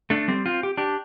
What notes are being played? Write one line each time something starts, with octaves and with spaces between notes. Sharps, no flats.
A3 D4
G3 C4
C4 F4
G4
D4 G4